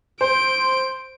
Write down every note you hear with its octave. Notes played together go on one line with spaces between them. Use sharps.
C5 C6 D7